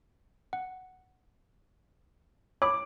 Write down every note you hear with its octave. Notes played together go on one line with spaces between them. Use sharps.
F#5
C#5 B5 D6